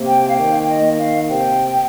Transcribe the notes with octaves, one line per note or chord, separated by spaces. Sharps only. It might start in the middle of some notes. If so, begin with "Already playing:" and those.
Already playing: C3 A#3
G5
F5
D#3 G5
D#5
A#3
F5
C3 G5